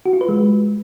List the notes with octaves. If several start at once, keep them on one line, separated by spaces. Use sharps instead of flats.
F#4
F4
B4
G#3